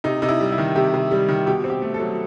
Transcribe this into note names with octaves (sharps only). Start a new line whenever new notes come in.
C3 D#4
C3 D#4
E4
G3
E4
D#3
C3 G4
C3
G3
D#3
B2 G4
C4
G4
A3
A4
F#3